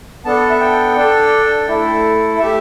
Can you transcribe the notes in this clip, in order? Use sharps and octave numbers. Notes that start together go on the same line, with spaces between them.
B3 D4 A4 A5
E5
G5
D4 A4
A3 E4 A4
A3 G4 E5